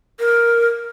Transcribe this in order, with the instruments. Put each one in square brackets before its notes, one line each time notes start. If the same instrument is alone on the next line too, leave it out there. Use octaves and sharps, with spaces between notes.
[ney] A#4